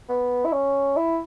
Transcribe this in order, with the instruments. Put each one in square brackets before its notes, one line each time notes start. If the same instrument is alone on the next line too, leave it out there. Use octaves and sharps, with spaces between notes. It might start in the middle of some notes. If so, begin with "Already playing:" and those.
[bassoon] B3
E4
C#4
E4